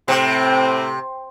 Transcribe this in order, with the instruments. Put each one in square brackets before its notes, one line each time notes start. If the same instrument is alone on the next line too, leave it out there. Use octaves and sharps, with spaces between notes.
[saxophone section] A2 C4 [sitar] C3